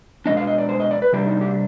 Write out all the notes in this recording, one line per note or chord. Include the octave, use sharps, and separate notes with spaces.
B2 G#3 D4 D#5
F5
D#5
D5
C5
D#5
D5
B4
C3 G3 D4 G4
D#4
G4